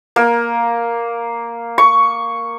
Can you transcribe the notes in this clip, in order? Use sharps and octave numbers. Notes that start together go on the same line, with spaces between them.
A#3
C#6